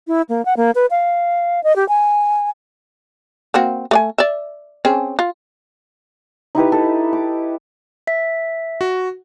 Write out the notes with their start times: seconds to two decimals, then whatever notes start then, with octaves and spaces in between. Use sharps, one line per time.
0.08 E4
0.29 A#3
0.45 F#5
0.57 A#3
0.75 B4
0.91 F5
1.64 D#5
1.76 G4
1.89 G#5
3.54 A#3 C4 F#4
3.91 A3 D5 G#5
4.18 D5 E5
4.85 C4 C#4 G#4
5.19 F4
6.55 D#4 E4 G4 B4
6.72 A4
7.13 D6
8.07 E5 B6
8.81 F#4